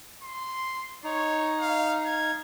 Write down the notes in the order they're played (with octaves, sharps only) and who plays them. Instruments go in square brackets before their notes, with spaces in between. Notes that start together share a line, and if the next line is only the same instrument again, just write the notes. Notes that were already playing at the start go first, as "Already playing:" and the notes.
[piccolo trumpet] C6
[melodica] D#4 [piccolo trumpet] C#5
[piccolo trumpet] F5
G#6